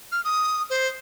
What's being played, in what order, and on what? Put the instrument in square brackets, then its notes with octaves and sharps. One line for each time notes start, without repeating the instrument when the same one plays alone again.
[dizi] F6
D#6
C5